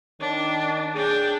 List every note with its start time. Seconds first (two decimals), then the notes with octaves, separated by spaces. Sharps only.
0.21 D#3 D4
0.95 D4 G#4 G5